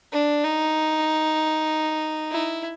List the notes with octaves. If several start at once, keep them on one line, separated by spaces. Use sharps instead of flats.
D4
D#4
E4